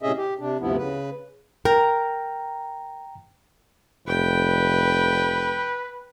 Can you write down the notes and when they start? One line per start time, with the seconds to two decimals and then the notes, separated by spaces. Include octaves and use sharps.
0.03 A2 C3 C#4 G#4 D#5 E5
0.17 G4
0.39 C3 D4
0.60 D2 G2 C3 F3 B3 E4
0.77 C#3 B4
1.65 A#4 G5 A#5
4.08 F1 B4 G5